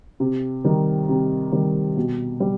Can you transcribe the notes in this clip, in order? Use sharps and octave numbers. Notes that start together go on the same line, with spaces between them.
C3
D#3 G3
C3
D#3 G3
B2
G3